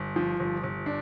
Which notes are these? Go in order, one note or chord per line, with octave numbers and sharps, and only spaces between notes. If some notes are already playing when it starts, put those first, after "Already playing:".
Already playing: G1
F3
G1
G1
D4